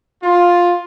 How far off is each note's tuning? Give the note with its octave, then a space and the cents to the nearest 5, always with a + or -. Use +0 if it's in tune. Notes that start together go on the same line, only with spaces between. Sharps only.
F4 +10